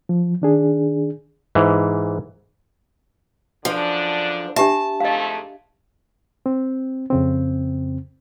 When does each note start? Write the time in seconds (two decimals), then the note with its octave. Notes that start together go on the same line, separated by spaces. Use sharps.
0.09 F3
0.42 D#3 D4 G#4
1.55 G#2 E3
3.65 F#2 D3 F3 D4
4.56 D4 G4 E5 A5
5.00 F2 G#2 A3 D#5 F5
6.46 C4
7.10 F2 C#3 C4